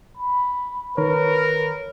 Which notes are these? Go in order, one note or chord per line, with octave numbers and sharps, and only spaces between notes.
B5
D#3 A#4 B4 C#5